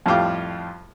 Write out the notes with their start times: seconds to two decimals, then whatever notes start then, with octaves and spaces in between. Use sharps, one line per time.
0.06 F2 A2 G3 F4 G4 D6